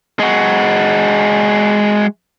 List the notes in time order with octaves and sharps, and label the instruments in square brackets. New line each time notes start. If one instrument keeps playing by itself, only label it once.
[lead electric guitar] G#3 F#4